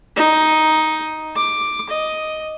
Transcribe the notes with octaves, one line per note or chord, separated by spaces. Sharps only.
D#4
D6
D#5